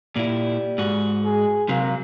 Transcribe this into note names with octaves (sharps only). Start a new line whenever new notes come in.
A#2 G3 E4
G#2 F#4
G#4
C3 F#3 A#3